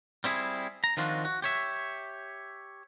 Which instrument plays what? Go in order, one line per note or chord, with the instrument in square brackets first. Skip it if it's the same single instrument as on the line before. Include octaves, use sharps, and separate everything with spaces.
[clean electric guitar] G3 C4 E4 G#4
A#5
D#3 F3 C4 D4 F4 F#4
F#4
G4 C#5 E5